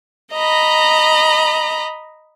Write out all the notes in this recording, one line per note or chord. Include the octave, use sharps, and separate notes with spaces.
D#5 A#5 B5